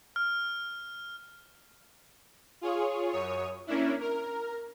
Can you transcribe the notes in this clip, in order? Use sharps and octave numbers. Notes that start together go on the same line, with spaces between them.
F6
F4 G#4 C#5
F#2 C#5 D#6
A#3 C#4 D4 E4
A#4